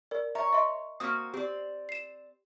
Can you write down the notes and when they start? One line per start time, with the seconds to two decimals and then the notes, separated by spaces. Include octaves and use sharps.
0.11 A#4 D5
0.35 C#5 E5 A#5
0.53 D#5 E5 C6
1.00 A#3 C4 F#4 D#6 F6
1.34 C4 G4 D5
1.89 C7 E7